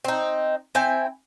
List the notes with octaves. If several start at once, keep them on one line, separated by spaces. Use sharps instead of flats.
C4 D#4
C4 E4 G5 G#5